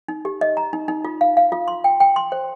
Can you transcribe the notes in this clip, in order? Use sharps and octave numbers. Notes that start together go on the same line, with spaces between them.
D#4
G4
D#5
A#5
D#4
D#4
F4
F5
F5
F4
C6
G5
G5
C6
C5